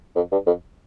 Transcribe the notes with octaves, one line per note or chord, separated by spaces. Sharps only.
F2
G2
F2